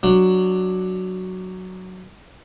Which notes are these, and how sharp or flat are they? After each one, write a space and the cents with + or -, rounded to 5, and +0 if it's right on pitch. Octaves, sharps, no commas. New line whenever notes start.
F#3 +0 D4 +10